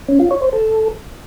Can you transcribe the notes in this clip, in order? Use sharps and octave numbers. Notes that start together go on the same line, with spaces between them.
C#4
F4
C#5
C5
A4